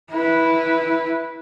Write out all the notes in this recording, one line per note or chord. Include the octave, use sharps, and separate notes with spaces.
E4 B4